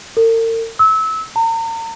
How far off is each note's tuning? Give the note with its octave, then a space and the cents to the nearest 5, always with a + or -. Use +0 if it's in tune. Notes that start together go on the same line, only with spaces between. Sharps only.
A#4 -45
E6 -25
A#5 -40